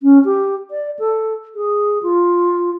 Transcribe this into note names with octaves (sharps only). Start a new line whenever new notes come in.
C#4
G4
D5
A4
G#4
F4